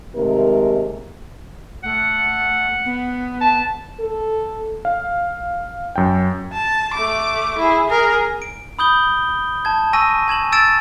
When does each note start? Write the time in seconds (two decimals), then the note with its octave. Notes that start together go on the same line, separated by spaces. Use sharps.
0.15 D#2 C3 G#3 A3 A#4
1.84 A3 F#5
2.85 B3
3.41 A5
3.99 A4
4.85 F5
5.96 F#2 G5
6.53 A5
6.94 A3 D6
7.58 E4 G#4
7.88 G#4 A#4
8.42 D7
8.79 B5 D#6 G6 G7
9.65 A5 G#6
9.93 G#5 C#6 E6 A#6 D#7
10.28 G#5 G#6 E7 F#7
10.52 E6 G#6 A6 D7 E7